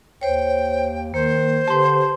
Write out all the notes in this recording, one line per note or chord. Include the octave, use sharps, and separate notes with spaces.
D#2 C5 C#5 G5
D#3 A#3 C5
D3 G4 B4 A5 C6